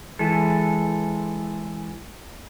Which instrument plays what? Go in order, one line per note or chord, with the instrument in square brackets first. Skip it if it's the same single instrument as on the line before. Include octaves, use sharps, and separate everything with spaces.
[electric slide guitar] E3 G#3 A4